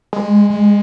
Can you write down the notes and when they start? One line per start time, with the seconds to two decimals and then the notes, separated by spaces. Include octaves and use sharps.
0.13 G#3
0.50 G#3